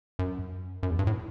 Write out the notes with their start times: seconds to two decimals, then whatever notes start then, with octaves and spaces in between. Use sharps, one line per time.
0.19 F#2
0.83 F#2
0.91 E2
0.99 G2
1.07 A2